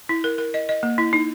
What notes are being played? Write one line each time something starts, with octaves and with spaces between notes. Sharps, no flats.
E4
A#4
A#4
D#5
D#5
A#3
E4
D#4